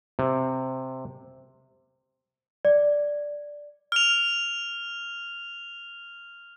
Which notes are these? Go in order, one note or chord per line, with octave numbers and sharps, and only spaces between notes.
C3
D5
F6 F7